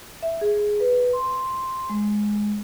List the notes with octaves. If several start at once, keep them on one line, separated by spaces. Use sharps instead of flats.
E5
G#4
B4
C6
G#3